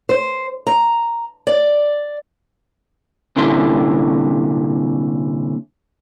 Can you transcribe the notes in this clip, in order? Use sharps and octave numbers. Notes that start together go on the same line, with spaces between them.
C5
A#5
D5
C2 A#2 D3 C#4 E4 C6